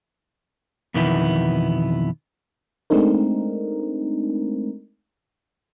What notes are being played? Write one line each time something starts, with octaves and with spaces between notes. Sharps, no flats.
F2 B2 D#3 E3 B3 E4
G#3 A3 C4 D4 D#4 A#4